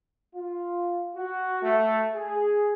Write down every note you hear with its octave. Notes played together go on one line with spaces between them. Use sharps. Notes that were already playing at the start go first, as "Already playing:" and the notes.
F4
F#4
A3
G#4